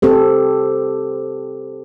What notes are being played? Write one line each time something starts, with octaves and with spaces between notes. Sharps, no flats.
C4 G4 A4 C5